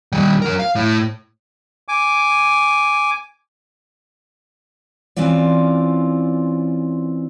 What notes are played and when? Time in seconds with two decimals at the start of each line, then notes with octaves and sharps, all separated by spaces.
0.12 D#3 G3
0.42 F#3 A#4
0.60 F5
0.75 A2
1.88 G#5 D6
5.16 E3 C4 C#4 F4 D5